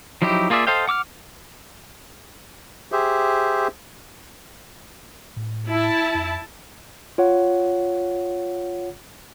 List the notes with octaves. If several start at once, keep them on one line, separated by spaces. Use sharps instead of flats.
F3 F#3 D#4 E4 G4
A#3 F4 G#4 D5 E5
A4 C5 D#5 F5 G5
F#5 D6 E6 F6
G4 G#4 C5 E5
A2
E4 A5
F2
F4 C#5 F#5